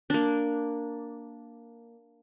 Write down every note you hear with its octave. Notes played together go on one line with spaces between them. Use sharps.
A#3 D4